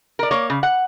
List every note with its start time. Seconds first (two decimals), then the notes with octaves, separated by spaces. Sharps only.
0.19 A#4 D5
0.31 A#3 C#5
0.50 C#3
0.63 F#5